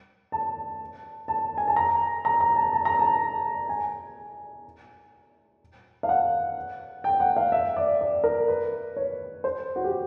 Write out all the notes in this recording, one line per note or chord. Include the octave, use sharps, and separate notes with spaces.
A5
A5
G#5
A5
A#5
A#5
A#5
A5
A5
A#5
A5
G#5
F5
F#5
G5
F#5
F5
E5
D5
D5
A#4
B4
C#5
C5
F#4
G4